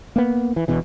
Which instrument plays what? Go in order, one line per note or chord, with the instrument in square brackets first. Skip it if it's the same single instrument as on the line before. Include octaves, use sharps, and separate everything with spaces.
[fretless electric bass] A#3 B3
E3
E1 E2 B2 E3